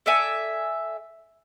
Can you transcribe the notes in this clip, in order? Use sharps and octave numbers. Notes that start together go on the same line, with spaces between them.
A4 D5 E5 G#5